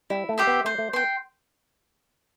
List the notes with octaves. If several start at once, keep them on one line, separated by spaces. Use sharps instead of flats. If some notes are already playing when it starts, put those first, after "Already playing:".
G3 E4
A3
G4 C5 E5
B3
A3 C5
A3
B3 G5 C6